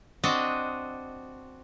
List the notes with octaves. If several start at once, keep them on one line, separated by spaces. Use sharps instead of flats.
C4 D4 F#4 D#5